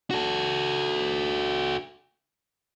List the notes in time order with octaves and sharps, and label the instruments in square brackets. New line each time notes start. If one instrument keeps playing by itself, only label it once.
[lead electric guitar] F#4 A4